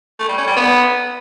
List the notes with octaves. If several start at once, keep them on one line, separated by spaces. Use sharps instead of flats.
A3
G3
C#4
G3
B3